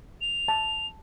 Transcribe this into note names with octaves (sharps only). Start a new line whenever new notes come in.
F7
A5